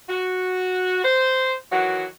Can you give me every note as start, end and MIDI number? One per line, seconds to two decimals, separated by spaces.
0.09 1.01 66
1.04 1.53 72
1.72 2.05 51
1.72 2.05 52
1.72 2.05 54
1.72 2.05 66